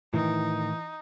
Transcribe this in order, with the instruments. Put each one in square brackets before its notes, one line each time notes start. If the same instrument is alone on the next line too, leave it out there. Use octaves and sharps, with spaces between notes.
[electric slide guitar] A2 D#3 [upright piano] E3 [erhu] D#4